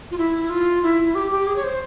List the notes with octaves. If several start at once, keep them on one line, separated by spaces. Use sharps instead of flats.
F4
E4
F4
E4
G4
G4
G#4
C#5
C5